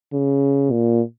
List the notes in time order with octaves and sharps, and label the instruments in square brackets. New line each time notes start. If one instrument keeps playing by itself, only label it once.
[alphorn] C#3
A#2